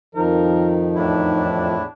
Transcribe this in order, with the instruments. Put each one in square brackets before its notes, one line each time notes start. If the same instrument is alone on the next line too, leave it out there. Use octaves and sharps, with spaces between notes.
[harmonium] F2 D#3 F3 [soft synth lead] D#4 [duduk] A#4
[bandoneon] E2 A2 E4 [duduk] D4